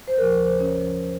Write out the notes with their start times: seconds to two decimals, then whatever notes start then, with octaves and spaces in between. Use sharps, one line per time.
0.08 C5
0.17 D#2 C#3 F3 A#4
0.45 C5
0.59 C#4 C#5
0.74 G#2 F3
1.02 C5